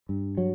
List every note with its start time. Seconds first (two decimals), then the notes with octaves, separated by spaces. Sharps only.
0.09 G2
0.37 F#3